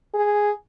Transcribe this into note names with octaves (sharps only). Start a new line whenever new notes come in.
G#4